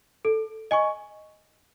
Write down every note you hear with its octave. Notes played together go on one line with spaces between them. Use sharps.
A4
D#5 G#5 C#6